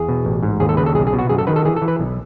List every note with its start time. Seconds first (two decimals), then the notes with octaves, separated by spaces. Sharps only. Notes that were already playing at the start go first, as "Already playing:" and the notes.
Already playing: E2 G#4
0.08 B2
0.25 A1
0.43 G#2
0.60 D#2 G#4
0.69 A4
0.77 C#3 B4
0.86 A4
0.95 B1 G#4
1.07 G#4
1.13 B2
1.19 F#4
1.29 F#2 G#4
1.38 A4
1.47 D#3 B4
1.56 A4
1.65 E3 G#4
1.76 A4
1.82 E3
1.88 B4
1.99 B1